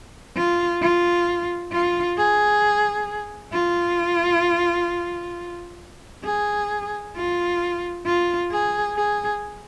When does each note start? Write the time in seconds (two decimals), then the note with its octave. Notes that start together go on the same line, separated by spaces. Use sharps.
0.36 F4
0.82 F4
1.72 F4
2.17 G#4
3.53 F4
6.24 G#4
7.16 F4
8.05 F4
8.51 G#4
8.96 G#4